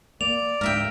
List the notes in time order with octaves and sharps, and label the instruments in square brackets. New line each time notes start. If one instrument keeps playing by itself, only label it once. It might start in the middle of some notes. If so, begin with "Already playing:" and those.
[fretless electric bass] A#3 [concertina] D5 D6 [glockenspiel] F7
[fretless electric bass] D2 G#2 [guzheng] A#4 E5 G5